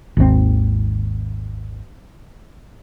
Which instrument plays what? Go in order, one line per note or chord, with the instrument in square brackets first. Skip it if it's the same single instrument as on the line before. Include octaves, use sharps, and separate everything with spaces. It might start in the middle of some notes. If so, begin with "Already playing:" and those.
[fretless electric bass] G#1 D#2 D#3 C4